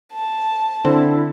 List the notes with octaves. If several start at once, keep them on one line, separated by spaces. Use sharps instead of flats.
A5
D3 C4 E4